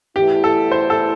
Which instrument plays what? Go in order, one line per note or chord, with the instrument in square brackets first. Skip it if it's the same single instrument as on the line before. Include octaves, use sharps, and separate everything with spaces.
[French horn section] E2 E3 A3 E4 [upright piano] G4
[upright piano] A4
C5
A4